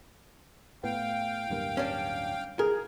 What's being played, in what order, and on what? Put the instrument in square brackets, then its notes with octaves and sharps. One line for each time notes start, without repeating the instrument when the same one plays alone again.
[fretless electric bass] A2 B3 [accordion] F5 G5
[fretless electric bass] D1 G2 A#3
[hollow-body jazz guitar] C#4 D4
[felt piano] G#4 [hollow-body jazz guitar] A#4